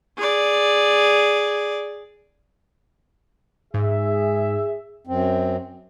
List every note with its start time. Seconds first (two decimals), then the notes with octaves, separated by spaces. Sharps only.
0.17 G#4 D5
3.74 G#2 G#4 E5
5.07 F#2 C4